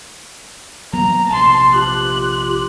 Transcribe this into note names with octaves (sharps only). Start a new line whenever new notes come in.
F#3 A#3 B3 A#5
A#1 C3 A#3 A5 C6
F4 G4 F#6